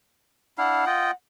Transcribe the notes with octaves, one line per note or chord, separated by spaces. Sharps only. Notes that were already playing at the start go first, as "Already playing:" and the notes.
D4 E4 F5 F#5
F4 D#5 G5